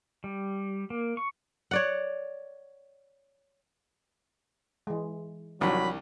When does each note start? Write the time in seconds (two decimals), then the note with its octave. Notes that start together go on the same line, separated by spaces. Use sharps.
0.24 G3
0.90 A#3
1.17 C#6
1.71 C#5 D5 F#5
4.87 E3 G#3
5.61 C2 D#3 F3 F#3 D4 B5